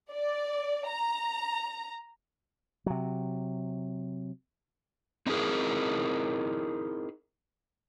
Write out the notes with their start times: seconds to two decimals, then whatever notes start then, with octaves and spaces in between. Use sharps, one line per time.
0.12 D5
0.89 A#5
2.86 C3 F#3
5.26 C4 D#4 E4 G#4 A#4